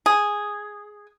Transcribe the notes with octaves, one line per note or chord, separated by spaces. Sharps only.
G#4